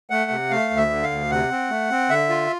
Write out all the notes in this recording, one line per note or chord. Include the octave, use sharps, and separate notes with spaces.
A3 F#5
C3
A3 F5
D2
E5
D3
F5
D2
C3 F#5
C4
A3
C4
D3 E5
F4